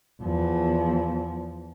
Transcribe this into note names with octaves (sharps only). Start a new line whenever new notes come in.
E2 F3